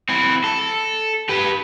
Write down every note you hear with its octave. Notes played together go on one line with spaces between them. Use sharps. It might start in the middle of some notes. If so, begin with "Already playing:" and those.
C4 E4
A4
G4 B4